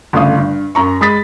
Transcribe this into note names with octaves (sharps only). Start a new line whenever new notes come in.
G1 C#3 A3 F5 D#6
G2
F#2 A#5 C#6
G#3 B5 D#6 A6 B6